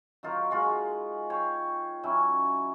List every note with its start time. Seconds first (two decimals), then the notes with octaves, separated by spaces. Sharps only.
0.23 F#3 D#4 F4 A#4
0.51 G#3 F4 F#4
1.30 C5 C#5 G5
2.03 F#3 C#4 E4